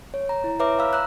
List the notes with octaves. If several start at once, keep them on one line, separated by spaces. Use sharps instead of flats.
C#5
A#5
E4
B4 C#5 E5 A#5 D6
F5 B5 E6 F6
A#5 E6 F#6